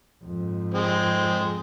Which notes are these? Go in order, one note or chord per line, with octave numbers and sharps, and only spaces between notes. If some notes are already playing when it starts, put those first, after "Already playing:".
F2 G#2
G#3 C4